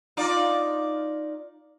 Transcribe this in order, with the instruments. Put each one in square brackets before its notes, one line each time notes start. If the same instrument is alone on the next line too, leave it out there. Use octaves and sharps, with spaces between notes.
[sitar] D#4 F4 D5